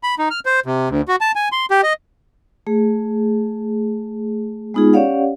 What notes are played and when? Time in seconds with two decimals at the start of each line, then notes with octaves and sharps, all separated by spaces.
0.03 B5
0.19 D#4
0.31 F6
0.46 C5
0.66 C3
0.89 D2
1.08 F#4
1.21 A5
1.35 G#5
1.52 C6
1.71 G4
1.83 D#5
2.67 A3 G#4
4.74 G#3 B3 D#4 F4 G#4
4.93 C#4 G4 C#5 D5 F5 F#5